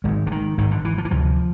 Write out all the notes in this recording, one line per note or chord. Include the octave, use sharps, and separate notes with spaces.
G#1 G#2 G#3
D3
D#3
G#1 G#2 D#3
D3
E3
F3
E3
D2 C3 F3